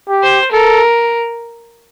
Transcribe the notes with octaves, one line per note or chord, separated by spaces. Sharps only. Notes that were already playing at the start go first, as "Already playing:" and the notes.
G4
C5
A4 A#4